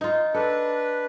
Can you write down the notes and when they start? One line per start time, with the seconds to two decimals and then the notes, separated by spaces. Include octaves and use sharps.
0.01 D#4 F4
0.34 D4 A4 B4